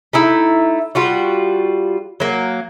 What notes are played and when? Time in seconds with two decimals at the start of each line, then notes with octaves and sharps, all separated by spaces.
0.13 A3 D#4 E4
0.95 G3 F4 F#4
2.20 F#3 A#3